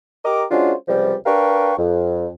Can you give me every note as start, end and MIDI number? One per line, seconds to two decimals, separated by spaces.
0.25 0.44 67
0.25 0.44 70
0.25 0.44 75
0.25 0.44 82
0.25 0.44 86
0.51 0.74 56
0.51 0.74 61
0.51 0.74 62
0.51 0.74 65
0.51 0.74 66
0.51 0.74 72
0.88 1.15 37
0.88 1.15 48
0.88 1.15 53
0.88 1.15 55
1.26 1.74 62
1.26 1.74 70
1.26 1.74 71
1.26 1.74 77
1.26 1.74 79
1.26 1.74 85
1.78 2.29 41